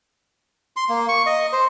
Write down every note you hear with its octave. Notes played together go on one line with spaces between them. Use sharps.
C6
A#3
C#6
D#5
C5